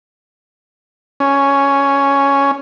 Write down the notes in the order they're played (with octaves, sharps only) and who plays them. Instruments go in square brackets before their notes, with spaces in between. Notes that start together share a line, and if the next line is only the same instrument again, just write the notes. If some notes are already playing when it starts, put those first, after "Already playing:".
[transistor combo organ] C#4